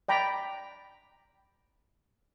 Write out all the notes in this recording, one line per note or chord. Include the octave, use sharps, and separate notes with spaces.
D5 G5 A#5 B5